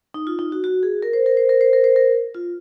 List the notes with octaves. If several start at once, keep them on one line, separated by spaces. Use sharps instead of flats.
D#4
F4
D#4
F#4
F#4
G#4
A#4
C5
A#4
C5
A#4
C5
A#4
C5
A#4
F4